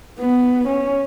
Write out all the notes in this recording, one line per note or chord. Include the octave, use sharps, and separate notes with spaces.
B3
C#4